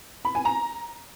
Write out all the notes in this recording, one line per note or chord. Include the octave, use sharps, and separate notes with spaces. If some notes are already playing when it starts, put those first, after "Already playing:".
B5
G#5
A#5